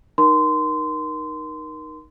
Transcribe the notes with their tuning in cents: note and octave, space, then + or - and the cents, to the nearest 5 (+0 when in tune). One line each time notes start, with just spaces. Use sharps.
D#4 -5 A#4 +20 C6 -20